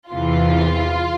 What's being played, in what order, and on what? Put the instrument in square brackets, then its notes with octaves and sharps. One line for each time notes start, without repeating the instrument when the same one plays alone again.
[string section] E2 C3 E3 F4